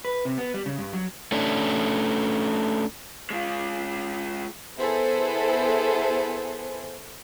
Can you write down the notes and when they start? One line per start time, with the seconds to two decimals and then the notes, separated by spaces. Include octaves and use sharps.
0.05 B4
0.25 C3
0.38 B3
0.54 G3
0.66 C#3
0.79 G2
0.93 F#3
1.32 A3 C#4 D4
3.30 G#3 F4
4.78 B3 E4 G#4 A4 C5